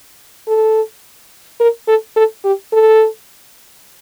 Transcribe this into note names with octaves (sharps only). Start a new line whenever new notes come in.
A4
A#4
A4
A4
G4
A4